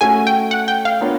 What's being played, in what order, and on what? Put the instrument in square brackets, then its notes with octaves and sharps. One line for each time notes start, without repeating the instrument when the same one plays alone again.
[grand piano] A3 C#4 F#4 [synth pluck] G#5
[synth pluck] G5
F#5
G5
F5
[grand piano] B3 D4 F4 A#4 C#5